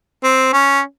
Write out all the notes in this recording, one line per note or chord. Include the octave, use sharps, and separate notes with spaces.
C4
C#4